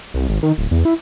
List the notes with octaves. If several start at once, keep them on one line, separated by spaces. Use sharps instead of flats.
C2
G#1
D#3
D1
E2
E4